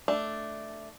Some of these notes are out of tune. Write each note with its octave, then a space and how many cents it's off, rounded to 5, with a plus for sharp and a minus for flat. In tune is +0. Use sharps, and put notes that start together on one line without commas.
A3 +0 D4 +0